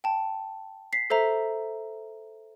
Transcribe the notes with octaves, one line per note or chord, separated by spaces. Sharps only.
G5 A5
B6 C7
A4 C5 E5 A#5